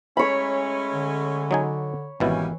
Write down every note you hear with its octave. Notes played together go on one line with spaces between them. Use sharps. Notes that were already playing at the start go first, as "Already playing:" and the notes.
G#3 A3 C#4 C#5 B5
D3
F#3 D#4 G#5
G#1 B2 E3 G3 A#3 C#4 E4